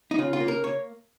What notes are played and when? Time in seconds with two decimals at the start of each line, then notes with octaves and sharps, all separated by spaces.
0.11 D#4
0.18 C#3 F4
0.33 F4
0.40 A#3
0.48 A#4
0.64 C#5